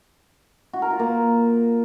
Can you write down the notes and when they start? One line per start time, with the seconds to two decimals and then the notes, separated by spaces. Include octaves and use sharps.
0.73 F#4
0.82 A#4
0.91 F4
0.99 A#3